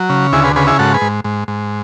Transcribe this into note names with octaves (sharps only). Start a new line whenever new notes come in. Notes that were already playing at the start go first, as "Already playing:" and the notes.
Already playing: F#3
C#3
D2 E4 G#4
G#4 B4
C#3 G#4 B4
E4 G#4
G#2 F#4 A4
G#4 B4
G#2
G#2
G#2